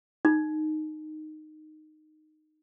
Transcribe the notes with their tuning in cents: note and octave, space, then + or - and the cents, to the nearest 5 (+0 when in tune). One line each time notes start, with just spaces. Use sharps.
D#4 -10